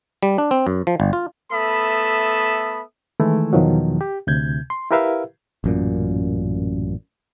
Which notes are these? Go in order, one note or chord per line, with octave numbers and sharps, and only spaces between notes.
G3
D4
C4
F#2
F3
G1
F4
A3 B3 A4 E5 B5 D#6
D#3 E3 G#3 A3 E4
E2 B2 D#3 F3 F#3
G4
D2 C3 G6 G#6
C6
E4 G4 A#4 B4 E5 F5
A1 F#2 A#2